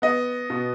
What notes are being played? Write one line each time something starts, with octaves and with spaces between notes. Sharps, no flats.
B3 D#5
B2